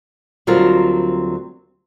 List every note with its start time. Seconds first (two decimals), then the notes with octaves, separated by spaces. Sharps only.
0.47 D2 F#3 G3 C4 F4 A#4